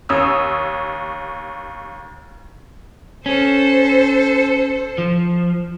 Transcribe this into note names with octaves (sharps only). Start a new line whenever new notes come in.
D#2 C#5 D#6 E6
C#4 A4 C5
F3